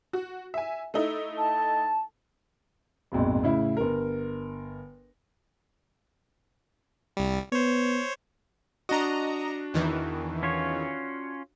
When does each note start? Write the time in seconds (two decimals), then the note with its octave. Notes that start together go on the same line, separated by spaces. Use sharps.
0.13 F#4
0.54 E5 G#5
0.94 A3 D#4 E4
1.38 A5
3.12 A#1 F2 G#2 B2
3.43 A2 C#3 E4
3.77 G1 A#4
7.17 C2 G3
7.52 B3 C5 C#5
8.89 D4 F#4 D#5 A#5
9.74 E2 D#3 E3
10.43 C#4 F4 C#5